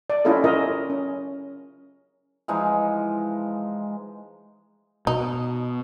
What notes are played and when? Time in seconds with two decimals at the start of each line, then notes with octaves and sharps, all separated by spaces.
0.10 D5
0.25 C#4 E4 F4 G4 A4 D#5
0.44 C#4 F4 A#4 D#5 E5
0.90 C#4
2.48 E3 F3 G#3 D#4
5.07 B2 D#4